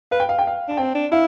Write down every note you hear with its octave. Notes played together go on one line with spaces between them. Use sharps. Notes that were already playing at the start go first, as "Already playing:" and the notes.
B4 F5
G5
F5
G5
F5
D4 A5
C4 G5
D4
E4 F5